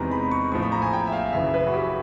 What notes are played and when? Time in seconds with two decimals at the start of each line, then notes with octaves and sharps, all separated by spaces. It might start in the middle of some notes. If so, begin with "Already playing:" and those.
Already playing: E2 C3 D#3 G#3 B3 A#5
0.11 B5
0.31 C#6
0.52 A#1 A2 F3 C#6
0.62 B5
0.72 A#5
0.82 G#5
0.93 G5
1.07 E5
1.12 F5
1.32 F#2 C#3 E3 E5
1.54 B4
1.67 F#4
1.74 G4